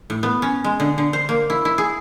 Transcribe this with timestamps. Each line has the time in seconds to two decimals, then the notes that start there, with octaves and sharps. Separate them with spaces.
0.10 A2
0.23 B3
0.42 C#4
0.64 G#3
0.80 D3
0.98 D3
1.13 C5
1.29 A#3
1.50 E4
1.65 E4
1.78 G#4